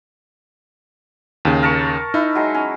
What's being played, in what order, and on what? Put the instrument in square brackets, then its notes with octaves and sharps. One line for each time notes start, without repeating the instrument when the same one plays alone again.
[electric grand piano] D#2 C#3
[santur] A#4 A5 C#6
[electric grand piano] D#4 [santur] E4
[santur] F#3 G#3
C#4